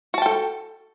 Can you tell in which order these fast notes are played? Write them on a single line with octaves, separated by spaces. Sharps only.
F#4 A5 G5 A4